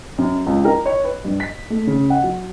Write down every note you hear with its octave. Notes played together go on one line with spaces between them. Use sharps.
F#2
C#2
A#4
C#5
B4
G2
B6
A3
C#3
F#5
F#3